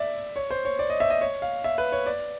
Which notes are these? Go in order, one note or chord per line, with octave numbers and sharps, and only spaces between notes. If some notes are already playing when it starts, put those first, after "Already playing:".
Already playing: D5 E5
C#5
C5
C#5
D5
D#5
E5
D#5
C#5
F5
E5
B4
C#5
D5